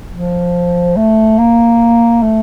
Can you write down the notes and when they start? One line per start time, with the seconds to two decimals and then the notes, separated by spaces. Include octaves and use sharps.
0.13 F3
0.96 A3
1.38 A#3
2.22 A3